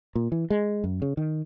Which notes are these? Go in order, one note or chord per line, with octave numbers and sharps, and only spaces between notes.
A#2
E3
G#3
F#2
C#3
D#3